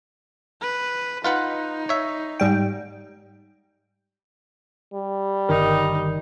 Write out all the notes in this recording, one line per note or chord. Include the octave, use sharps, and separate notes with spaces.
B4
D#4 F4 B4 F#5
C#5 E5
G#2 G3 G5
G3
G1 D#3 D#4 A#4